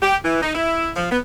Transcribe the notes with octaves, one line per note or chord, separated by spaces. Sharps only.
G4
E3
D#4
E4
F3
B3